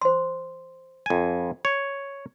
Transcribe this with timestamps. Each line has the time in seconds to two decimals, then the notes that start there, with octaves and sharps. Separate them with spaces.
0.01 C5 C6
1.06 F2 G#5
1.65 C#5